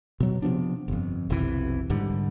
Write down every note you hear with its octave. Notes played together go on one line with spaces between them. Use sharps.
B2 F#3
C3 F3 B3 D4
G1 F2
F1 B1 C3 E3
C2 G#2 D3 G3